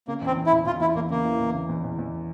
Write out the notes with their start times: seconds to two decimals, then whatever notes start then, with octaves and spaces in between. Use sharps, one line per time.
0.08 C#3 A#3
0.22 E2 C4
0.37 E2
0.46 E4
0.52 E2
0.66 E2 F4
0.80 E2 E4
0.95 E2 A#3
1.10 C#3 A#3
1.25 E3
1.40 E2
1.54 C#3
1.69 E2
1.84 E2
1.99 E2